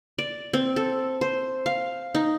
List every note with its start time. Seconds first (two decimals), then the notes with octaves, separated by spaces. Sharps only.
0.18 D5
0.53 C4
0.76 A4
1.21 C5
1.66 F5
2.15 D#4